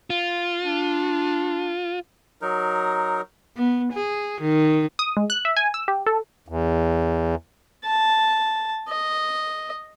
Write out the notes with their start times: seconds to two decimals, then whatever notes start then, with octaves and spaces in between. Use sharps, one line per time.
0.10 F4
0.63 D4
2.41 F#3 D#4 A#4
3.57 B3
3.93 G#4
4.41 D#3
4.99 D#6
5.17 G#3
5.30 F#6
5.45 E5
5.57 G#5
5.74 E6
5.88 G4
6.06 A4
6.48 E2
7.85 A5
8.89 D#5